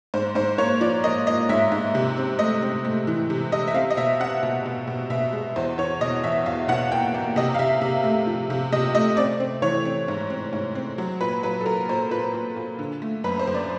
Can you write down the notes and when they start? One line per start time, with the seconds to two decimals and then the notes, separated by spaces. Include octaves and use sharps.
0.14 G#2 C5
0.35 G#2 C5
0.58 A#3 C#5
0.81 F3 D5
1.04 A#3 D#5
1.27 A#3 D#5
1.49 G#2 E5
1.72 G#2
1.95 C3
2.17 C4
2.39 A3 D#5
2.62 C4
2.85 A3
3.07 E3
3.30 C3
3.52 C3 D#5
3.68 E5
3.74 C4 F5
3.90 D#5
3.97 B2 E5
4.20 C4 F#5
4.43 B2
4.66 B2
4.87 B2
5.10 B2 E5
5.33 G#3
5.56 E2 C5
5.78 E2 C#5
6.01 B2 D#5
6.24 E2 E5
6.46 E2 F5
6.68 B2 F#5
6.92 A#3 G5
7.14 A#3
7.36 C3 D#5
7.55 F5
7.59 C3 E5
7.81 C3
8.04 A3
8.27 F3
8.50 C3
8.72 C3 D#5
8.95 A3 D#5
9.17 C4 D5
9.40 C4
9.62 E3 C#5
9.85 C4
10.08 G#2
10.30 C4
10.53 G#2
10.75 C4
10.98 F#3
11.21 A#2 B4
11.43 F#3 B4
11.61 A4
11.66 F#3 A#4
11.89 A#2 C5
12.11 A#2 B4
12.34 A#2
12.56 A#2
12.79 D3
13.02 A3
13.24 F#2 B4
13.39 C5
13.47 F#2
13.55 D5